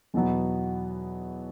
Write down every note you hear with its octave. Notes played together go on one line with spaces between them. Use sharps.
E2 B2 F#3 B3